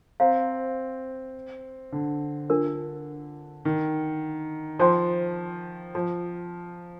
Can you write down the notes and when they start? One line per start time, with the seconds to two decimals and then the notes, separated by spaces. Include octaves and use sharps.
0.20 C4 C5 F5 A#5
1.92 D3
2.50 D4 F4 A#4
3.65 D#3
4.79 F3 C5 G5 C6
5.95 F3